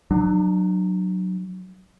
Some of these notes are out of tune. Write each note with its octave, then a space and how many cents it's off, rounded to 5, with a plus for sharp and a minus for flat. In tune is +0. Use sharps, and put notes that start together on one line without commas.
F#3 +0 D4 +40